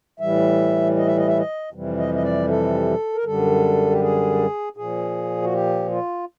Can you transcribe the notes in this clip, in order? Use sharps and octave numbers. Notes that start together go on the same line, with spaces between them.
A2 E3 G3 E5
D#5
E5
D#5
E5
D#5
F2 C3 E3 G3
D#5
D#5
D5
A4
A#4
F#2 D3 G3 A4
G4
G#4
A#2 F3 G#4
F#4
G4
F4